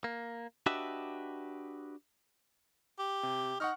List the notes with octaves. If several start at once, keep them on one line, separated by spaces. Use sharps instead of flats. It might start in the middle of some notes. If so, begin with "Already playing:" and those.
A#3
D4 F#4 G4 B4 D#5 E5
G4
C3
D#4 F#5 C#6 F6